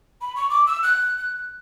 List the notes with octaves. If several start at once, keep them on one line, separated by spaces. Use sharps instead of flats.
B5
C#6
D6
E6
F#6
F#6